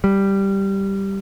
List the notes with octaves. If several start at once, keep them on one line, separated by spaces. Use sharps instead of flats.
G3